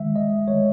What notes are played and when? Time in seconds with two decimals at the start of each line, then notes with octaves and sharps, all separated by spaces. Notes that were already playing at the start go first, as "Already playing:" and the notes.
Already playing: D#3 G#3 E5
0.16 D#5
0.47 D#3 G#3 C#5